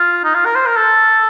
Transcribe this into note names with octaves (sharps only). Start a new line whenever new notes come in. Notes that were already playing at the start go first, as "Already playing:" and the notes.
Already playing: F4
D#4
F4
A#4
C5
A#4
A4